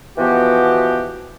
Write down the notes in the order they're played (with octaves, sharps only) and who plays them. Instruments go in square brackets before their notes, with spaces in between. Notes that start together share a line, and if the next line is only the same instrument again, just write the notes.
[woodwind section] B2 E3 F3 B3 F#4 G4